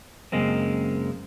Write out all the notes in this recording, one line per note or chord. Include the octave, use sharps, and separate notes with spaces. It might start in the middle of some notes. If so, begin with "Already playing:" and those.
F#2 C#3 G#3 A#3 C4